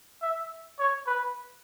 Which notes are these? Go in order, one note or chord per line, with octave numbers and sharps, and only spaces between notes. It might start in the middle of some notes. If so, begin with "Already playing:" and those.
E5
C#5
B4